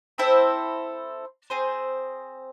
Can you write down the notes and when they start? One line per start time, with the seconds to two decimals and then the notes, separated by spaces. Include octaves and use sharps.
0.18 C4 E4 A4 C5
1.50 C4 G#4 C5